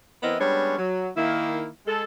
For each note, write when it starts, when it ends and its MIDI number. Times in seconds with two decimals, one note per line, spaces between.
0.23 0.37 52
0.23 0.37 59
0.23 0.37 60
0.23 0.37 64
0.23 0.37 70
0.23 0.37 75
0.39 0.76 55
0.39 0.76 56
0.39 0.76 59
0.39 0.76 61
0.39 0.76 62
0.39 0.76 73
0.78 1.09 54
1.17 1.67 51
1.17 1.67 58
1.17 1.67 64
1.87 2.03 56
1.87 2.03 69